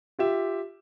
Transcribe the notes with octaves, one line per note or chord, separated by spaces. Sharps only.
F4 G4 E5